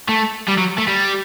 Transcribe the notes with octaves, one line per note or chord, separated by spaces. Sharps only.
A3
G3
F#3
A3
G3